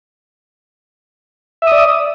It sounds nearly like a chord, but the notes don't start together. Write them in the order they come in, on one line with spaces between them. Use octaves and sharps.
E5 D#6 D5